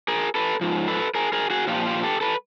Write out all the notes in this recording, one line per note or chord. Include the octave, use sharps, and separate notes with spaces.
G#4 A#4
A4 B4
G#2 F3
A4 B4
G#4 A#4
G#4 A#4
F#4 G#4
A#2 F3 F4 G4
F4 G4
G4 A4
A4 B4